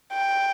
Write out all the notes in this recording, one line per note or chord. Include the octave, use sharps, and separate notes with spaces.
G5